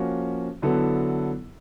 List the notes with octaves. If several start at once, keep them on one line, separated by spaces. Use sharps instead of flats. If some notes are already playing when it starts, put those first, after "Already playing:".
Already playing: F3 A#3 C#4 F#4
D3 F#3 B3 E4 A4